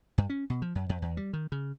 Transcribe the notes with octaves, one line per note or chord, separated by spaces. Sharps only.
G2
C#4
B2
F3
F#2
F2
E2
G3
D#3
C#3